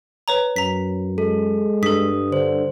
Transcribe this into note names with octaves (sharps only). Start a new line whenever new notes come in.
B4 C#5 A#5
F#2 A#5 B6
G#3 A4
G2 A4 D#6 B6
D3 C5